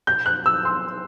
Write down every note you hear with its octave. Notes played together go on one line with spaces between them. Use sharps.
G6
F#6
E6
C6